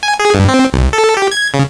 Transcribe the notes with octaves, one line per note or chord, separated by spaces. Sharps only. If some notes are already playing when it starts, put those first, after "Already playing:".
G#5
G#4
G2
C4
C2
A4
G4
G#6
C#3